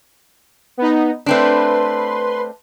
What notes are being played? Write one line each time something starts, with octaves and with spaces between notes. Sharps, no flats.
B3 D#4
A3 C4 D4 B4 C6